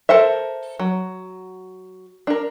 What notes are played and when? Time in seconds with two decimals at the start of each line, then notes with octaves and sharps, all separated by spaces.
0.09 A4 A#4 C5 E5
0.80 F#3
2.27 D4 A#4